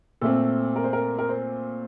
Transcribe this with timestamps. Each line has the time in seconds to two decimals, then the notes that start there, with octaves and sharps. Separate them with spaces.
0.21 A#2 A3 C4 A4
0.76 A#4
0.84 C5
0.93 A#4
1.19 A#4
1.29 C5